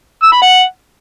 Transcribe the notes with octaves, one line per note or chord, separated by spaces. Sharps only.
E6
B5
F#5